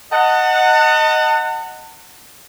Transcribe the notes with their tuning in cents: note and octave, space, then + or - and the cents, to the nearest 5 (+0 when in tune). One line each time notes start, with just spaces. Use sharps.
D#5 +0 F#5 +0 A5 +40